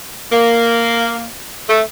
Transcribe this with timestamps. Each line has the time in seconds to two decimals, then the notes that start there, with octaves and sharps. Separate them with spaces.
0.32 A#3
1.69 A3